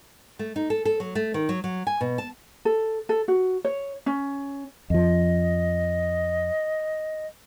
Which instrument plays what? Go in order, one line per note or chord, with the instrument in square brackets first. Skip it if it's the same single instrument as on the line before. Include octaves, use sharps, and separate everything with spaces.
[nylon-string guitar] A3
D#4
A4
A4
F#3
A3
D#3
F#3
F#3
G#5
B2
A5
[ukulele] A4
A4
F#4
C#5
C#4
[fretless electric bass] F2 F3 [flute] D#5